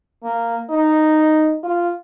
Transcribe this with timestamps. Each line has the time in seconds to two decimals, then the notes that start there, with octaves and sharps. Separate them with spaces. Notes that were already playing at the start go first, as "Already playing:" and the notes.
0.24 A#3
0.70 D#4
1.63 F4